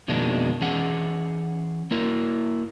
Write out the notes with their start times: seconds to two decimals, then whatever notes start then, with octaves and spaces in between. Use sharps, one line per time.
0.08 F2 B2 D#3 G#3 A#3 D4
0.61 E3 C#4 G#4 F#5
1.91 A#3 E4 A#4